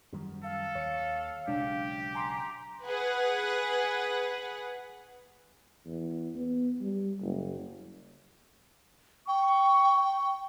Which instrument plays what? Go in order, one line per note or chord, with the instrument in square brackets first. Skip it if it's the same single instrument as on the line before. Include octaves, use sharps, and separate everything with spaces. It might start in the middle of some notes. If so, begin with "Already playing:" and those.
[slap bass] F#2 D#3 F3 [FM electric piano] G3
[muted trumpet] A4 [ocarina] F5
[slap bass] D#2 [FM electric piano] C#5 C#7
[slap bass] B1 C#3 F#3 [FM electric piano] G#3 D4 [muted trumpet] G4
[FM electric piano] G#5 C6 D6 [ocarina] A#5
[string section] G#4 B4 F#5
[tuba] E2
B3
G3
F#1
[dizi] G5 [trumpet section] C#6